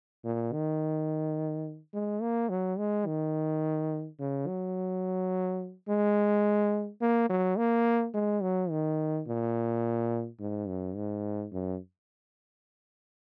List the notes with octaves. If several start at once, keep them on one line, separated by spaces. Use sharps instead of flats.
A#2
D#3
G#3
A#3
F#3
G#3
D#3
C#3
F#3
G#3
A#3
F#3
A#3
G#3
F#3
D#3
A#2
G#2
F#2
G#2
F#2